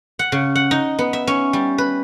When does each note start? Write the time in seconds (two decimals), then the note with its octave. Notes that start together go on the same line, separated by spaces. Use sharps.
0.19 F#5
0.32 C#3
0.55 F#5
0.71 D#4
0.99 B3
1.13 E5
1.27 C#4
1.53 G3
1.78 B4